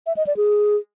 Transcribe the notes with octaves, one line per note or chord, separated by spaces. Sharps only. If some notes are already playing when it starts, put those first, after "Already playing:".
E5
D#5
D5
G#4